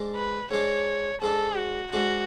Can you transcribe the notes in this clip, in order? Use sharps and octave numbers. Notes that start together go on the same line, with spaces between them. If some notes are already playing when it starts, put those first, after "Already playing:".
Already playing: G#2 G#3 D4
B4
G#2 G#3 D4 C#5
G#2 G#3 D4 A4
F#4
G#2 G#3 D4 F#4